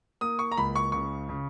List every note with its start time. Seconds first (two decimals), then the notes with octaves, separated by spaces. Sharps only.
0.21 A#3 D#6
0.39 C#6
0.52 A#5
0.57 C#2 B5
0.76 C#6
0.92 C#3 C#6
1.29 C#3